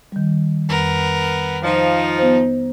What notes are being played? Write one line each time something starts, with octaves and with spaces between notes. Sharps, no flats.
D#3 G3
F2 B3 A#4
F3 D#4
B3 C5